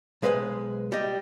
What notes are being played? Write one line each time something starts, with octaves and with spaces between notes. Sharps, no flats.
B1 G#3 B4 C5 F5 G#5
G3 G4 D#5